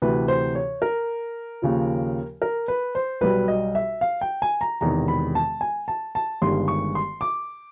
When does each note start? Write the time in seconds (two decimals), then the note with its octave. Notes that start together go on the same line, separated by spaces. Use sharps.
0.02 D2 C3 E3 B4
0.28 C5
0.55 C#5
0.82 A#4
1.62 D#2 C#3 F3
2.42 A#4
2.68 B4
2.95 C5
3.21 B1 B2 G3 B4
3.48 D#5
3.75 E5
4.01 F5
4.21 G5
4.42 G#5
4.61 A#5
4.81 E1 E2 C3 D#3 A#5
5.08 B5
5.35 A5
5.61 G#5
5.88 A5
6.15 A5
6.42 G1 G2 D#3 G#3 C6
6.68 C#6
6.95 C6
7.21 D6